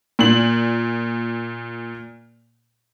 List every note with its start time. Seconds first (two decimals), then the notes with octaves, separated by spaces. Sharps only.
0.19 A#2 F#7